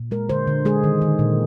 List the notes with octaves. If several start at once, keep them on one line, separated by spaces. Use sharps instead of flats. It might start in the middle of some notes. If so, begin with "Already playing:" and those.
Already playing: A#2
G#3 A#4
D3 C5
D3
G#3 G#4
D#3
D#3
A#2